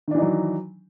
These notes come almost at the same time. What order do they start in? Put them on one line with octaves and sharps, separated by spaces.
D#3 D4 E3 D#4 F#3